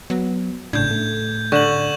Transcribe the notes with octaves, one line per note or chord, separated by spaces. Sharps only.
F#3 B3
G#1 A2 C#3 D4 G6 G#6
A3
D3 C#6 E7 F#7